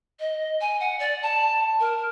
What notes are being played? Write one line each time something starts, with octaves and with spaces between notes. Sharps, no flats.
D#5
G#5
F#5
D5
A5
A#4